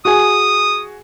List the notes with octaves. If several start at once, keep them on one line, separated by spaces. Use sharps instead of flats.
F#4 G#4 G#5 D#6